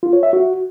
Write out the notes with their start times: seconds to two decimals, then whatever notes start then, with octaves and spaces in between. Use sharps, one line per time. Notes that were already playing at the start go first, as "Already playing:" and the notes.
0.03 F4
0.13 C#5
0.23 E5
0.33 F#4